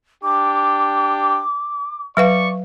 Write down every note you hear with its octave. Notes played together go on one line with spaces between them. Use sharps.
D4 G4 D6
F#3 B4 D5 F5 C#6